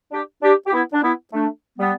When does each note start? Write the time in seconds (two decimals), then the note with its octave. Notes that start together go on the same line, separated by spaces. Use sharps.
0.12 D4 G4
0.42 D4 G4
0.67 G4
0.73 B3 E4
0.93 D4
1.03 B3 E4
1.33 A3 D4
1.78 G3 B3